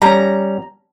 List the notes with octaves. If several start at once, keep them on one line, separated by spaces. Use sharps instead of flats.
G3 C#4 A#5